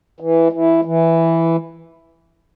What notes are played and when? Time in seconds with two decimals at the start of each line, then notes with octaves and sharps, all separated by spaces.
0.20 E3
0.52 E3
0.85 E3